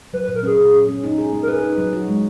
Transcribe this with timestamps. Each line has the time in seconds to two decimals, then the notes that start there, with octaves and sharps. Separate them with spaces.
0.13 F#3 B4
0.24 B4
0.28 A#2
0.35 A#4
0.43 C#4 G#4
0.58 A#2
0.73 C#4
0.89 C#4
1.04 D#4
1.18 G#4
1.33 A#3
1.43 A#4
1.48 G#4 B4
1.63 D#4
1.78 F#3
1.93 F#4
2.08 G#3